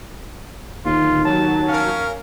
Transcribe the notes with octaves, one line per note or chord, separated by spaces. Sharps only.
D1 D#2 F4
F#3 A5
C#4 A#4 F5